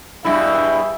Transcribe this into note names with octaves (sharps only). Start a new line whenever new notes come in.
G2 B2 E4 G#4 E5